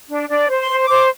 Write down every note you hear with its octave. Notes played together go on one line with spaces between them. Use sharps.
D4
D4 D5
C5
C6
C5
D6
C5